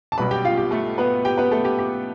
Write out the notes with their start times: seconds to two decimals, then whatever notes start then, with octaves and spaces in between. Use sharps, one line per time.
0.12 A5
0.18 B1 B2 G3 B4 B5
0.31 G4 G5
0.45 F4 F5
0.57 G4
0.71 A3 A4
0.98 B3 B4
1.25 G4 G5
1.38 B3 B4
1.51 A3 A4
1.65 G4
1.79 G4